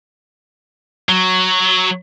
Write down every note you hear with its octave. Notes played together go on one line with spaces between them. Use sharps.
F#3